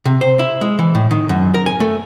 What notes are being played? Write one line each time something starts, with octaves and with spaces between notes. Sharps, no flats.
C3
C5
E4
G#3
E3
A2
D#3
F#2
A#4
G#5
A3